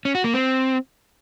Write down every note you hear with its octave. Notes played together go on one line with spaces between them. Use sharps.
C#4
F#4
A#3
C4